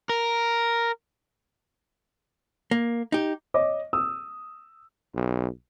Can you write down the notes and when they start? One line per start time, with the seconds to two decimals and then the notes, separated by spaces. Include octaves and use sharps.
0.09 A#4
2.71 A#3
3.12 D#4 G4
3.54 C#5 D#5 D6
3.93 D#6 E6
5.15 B1